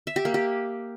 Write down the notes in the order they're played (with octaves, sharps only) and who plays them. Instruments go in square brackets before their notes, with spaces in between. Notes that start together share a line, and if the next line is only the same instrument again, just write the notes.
[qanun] E5
G4
A#3
G4